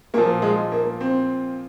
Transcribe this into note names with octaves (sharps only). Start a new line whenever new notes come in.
A#2 F3 A#3
G#3
A#3
C4